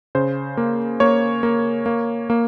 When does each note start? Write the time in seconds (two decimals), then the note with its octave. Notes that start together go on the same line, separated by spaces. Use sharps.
0.15 C#3 C5
0.57 A#3
1.00 A#3 C#5
1.43 A#3
1.86 A#3
2.30 A#3